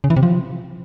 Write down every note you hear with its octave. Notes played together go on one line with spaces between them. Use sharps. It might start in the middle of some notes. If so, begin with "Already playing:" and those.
C#3
E3
C3
F3